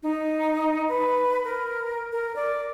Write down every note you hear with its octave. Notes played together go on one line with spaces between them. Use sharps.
D#4
B4
A#4
A#4
D5